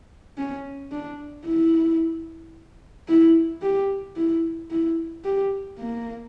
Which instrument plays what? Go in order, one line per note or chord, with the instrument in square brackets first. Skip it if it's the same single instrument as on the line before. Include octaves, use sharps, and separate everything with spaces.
[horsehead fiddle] C#4
D4
E4
E4
G4
E4
E4
G4
A#3